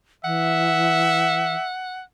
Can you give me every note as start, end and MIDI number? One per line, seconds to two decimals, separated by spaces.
0.24 1.55 52
0.24 1.68 76
0.24 2.01 78